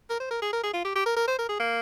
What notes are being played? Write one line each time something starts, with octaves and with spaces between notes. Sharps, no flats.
A#4
C5
A#4
G#4
A#4
G#4
F4
G4
G4
A#4
A#4
C5
A#4
G#4
A#3